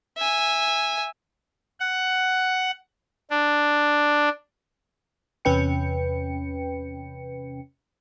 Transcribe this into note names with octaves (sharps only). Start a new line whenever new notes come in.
E5 G#5
F#5
D4
E2 C3 C#4 B4 G5 C#7